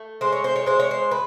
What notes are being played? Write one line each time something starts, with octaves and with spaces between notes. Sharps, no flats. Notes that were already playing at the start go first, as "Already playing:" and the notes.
Already playing: A3
G#3 C5
C#5
C5
C#5
G#3 C5
C#5
C5
B4